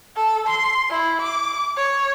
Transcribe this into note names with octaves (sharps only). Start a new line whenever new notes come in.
A4
C6
E4
D6
C#5